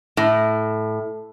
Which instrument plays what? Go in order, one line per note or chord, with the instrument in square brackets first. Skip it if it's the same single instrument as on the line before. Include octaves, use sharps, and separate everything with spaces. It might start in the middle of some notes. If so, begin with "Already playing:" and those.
[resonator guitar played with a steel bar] A2